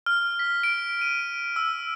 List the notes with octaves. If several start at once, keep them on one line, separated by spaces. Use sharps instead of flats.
F6
B6
D7
D#7
E6